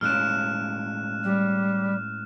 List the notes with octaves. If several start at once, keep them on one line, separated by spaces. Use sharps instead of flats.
A2 G#3 C#4 F6 F#6 E7
G3